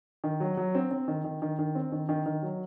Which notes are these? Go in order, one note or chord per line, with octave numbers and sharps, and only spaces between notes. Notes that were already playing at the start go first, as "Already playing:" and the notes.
D#3
F#3
F#3
C4
C4
D#3
D#3
D#3
D#3
C4
D#3
D#3
D#3
F#3